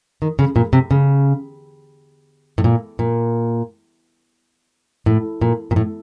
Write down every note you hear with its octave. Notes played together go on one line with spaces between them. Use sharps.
D#3
C#3
A#2
C3
C#3
A2
A#2
A#2
A2
A#2
A#2
A2